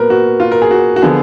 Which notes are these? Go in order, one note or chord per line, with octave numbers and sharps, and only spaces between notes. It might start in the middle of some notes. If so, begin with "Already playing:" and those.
Already playing: A#2 F#3 B3 A#4 B4
F#4
F4
A#4
G#4
F#4
F#4
D3 F3 B3 G#4